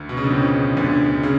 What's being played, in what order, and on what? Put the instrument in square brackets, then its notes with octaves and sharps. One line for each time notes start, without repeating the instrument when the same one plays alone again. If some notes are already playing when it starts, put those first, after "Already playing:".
Already playing: [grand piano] D2 D3
B2
C#3
D3
F2 F3
D2 D3
C#3